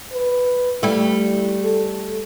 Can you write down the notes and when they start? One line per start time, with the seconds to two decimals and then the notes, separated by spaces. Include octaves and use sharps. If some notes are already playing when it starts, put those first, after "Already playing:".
0.13 B4
0.83 G3 A3 E4
1.63 A4